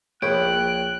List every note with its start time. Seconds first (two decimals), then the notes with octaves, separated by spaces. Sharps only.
0.22 A#1 E4 C#5 G5 F#6